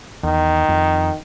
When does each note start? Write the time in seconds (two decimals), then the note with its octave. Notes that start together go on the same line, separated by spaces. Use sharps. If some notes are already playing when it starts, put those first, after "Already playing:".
0.23 E2 D#3
0.69 F2